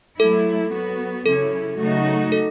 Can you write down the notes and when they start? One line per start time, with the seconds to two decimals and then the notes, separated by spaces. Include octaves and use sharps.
0.19 F#3 A3 E4 A4
0.73 F#3 B3 F#4
1.26 C#3 F#3 C#4 E4 A4
1.79 C#3 F#3 A3 D#4 F#4
2.32 A4